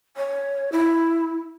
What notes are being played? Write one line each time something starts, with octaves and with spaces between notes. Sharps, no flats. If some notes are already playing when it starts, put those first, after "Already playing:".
C#5
E4